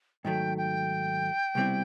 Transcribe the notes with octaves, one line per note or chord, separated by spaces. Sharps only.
G#2 D#3 F#3 A3 G5
G5
C2 B2 G3 C4 E4